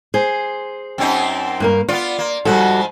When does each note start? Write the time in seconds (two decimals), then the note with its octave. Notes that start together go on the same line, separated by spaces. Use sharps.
0.14 G#4 C5
0.98 F#2 C4 D#4
1.60 G2 A#3 A#4
1.89 B3 F4 D5
2.19 A#3
2.45 G#2 F3 G3 F#4 A4